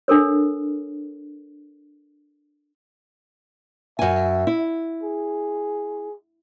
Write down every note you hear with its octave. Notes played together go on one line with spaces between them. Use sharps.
D4 A4 A#4 C#5
F#2 E5 G#5
E4
G#4